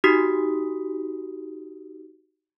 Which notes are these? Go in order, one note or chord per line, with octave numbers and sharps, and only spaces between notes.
D#4 F#4 G4 D#6 B6